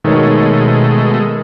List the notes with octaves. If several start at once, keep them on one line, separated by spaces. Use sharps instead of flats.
B2 D#3 G#3 A3 C#5